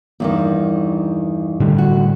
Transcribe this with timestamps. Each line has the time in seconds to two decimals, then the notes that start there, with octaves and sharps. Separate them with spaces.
0.20 E2 G2 D#3
1.60 A2 D3 G3
1.78 F#4